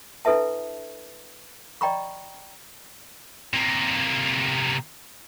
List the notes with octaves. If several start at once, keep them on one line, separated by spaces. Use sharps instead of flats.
D4 E4 A4 B4 E5 A5
D5 D#5 G5 A#5 B5 C#6
C3 A#3